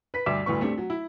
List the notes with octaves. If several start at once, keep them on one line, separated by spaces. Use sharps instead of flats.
B4 B6
D2 G2 E5 D6 B6 E7
G1 D2 A2 B4 C#6
A3 C4 D4 G4
F#3
E4